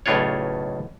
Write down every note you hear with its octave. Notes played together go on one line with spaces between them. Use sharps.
B1 A2 C#3 D4 F4 C#5